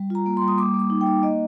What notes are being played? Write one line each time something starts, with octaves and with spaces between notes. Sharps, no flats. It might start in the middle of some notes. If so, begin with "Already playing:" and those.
Already playing: G3
F4 A#5
A#3
C6
G3
D#6
A#3 D6
A#3
D6
D#4
G5
D#4
A#3 D#5